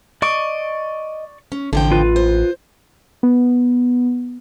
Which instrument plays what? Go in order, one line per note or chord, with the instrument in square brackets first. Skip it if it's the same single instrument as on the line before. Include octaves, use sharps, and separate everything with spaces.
[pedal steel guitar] D5 C#6 D6 [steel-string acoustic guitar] D#5
[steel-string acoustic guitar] C#4
[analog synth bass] A1 [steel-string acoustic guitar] D3 F3 G5
[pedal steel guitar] F4 B4
[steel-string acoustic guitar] C5
[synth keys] B3